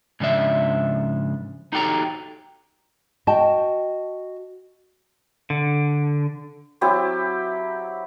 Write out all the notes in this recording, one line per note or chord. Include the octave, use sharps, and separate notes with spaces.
G#2 C#3 F3 D4 E5
D#4 F#4 G4 A4 A#5
F#4 D#5 G5 A5
D3
F#3 C4 E4 G4